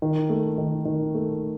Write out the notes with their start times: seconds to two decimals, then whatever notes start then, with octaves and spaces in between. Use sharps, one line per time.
0.02 D#3
0.29 A3
0.58 D#3
0.85 D#3
1.14 A3